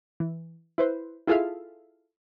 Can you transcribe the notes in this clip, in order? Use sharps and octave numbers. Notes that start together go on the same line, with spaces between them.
E3
E4 B4 C5
E4 F4 G#4 A4 E5 F5